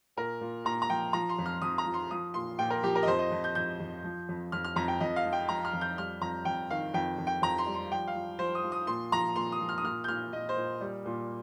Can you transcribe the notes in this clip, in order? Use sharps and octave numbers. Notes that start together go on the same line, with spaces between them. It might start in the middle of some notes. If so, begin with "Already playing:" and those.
A#2 A#4
A#2
A#2 A#5
A#5
F3 G5
F3 A#5
C6
F2
F6
F2 D#6
A#5
F3
C6
F3 D#6
A#2 C6
A#2 G5
A#4
F3 G4
A#4
D#5
F2 C5
D#5
F2
G6
F2 G6
F2
F3
F2
F2 F6
F6
F2 A#5
G5
F2 D#5
F5
F3
G5
F3 A#5
F6
F2
G6
G3 F6
F2 A#5
F2 G5
D#3 F5
F2 G5
F2
G5
F2 A#5
C6
G3
C6
F3 G5
F5
F3
F3 C5
D#6
F3
D#6
A#2 C6
F3 A#5
A#2 C6
D#6
F3
F6
D#6
A#2 F6
G6
A#2 F6
A#2 D#5
C5
A#2
G3
A#2